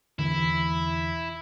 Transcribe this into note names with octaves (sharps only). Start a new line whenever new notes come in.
E1 D3 E3 E4